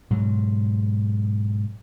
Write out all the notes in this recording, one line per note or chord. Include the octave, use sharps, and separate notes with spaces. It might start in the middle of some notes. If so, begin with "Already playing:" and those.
G#2 B2 F#3